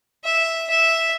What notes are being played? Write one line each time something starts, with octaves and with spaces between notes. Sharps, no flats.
E5
E5